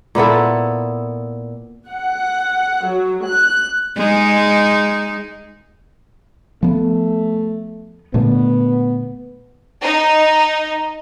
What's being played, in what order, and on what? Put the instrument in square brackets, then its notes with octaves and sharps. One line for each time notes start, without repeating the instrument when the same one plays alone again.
[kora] A#2 B3 E4 A4
[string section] F#5
F#3
F#6
[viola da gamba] G#3 D#4
[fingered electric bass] F3 B3 [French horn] A3
[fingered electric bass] A#2 D3 A3 [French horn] B3
[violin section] D#4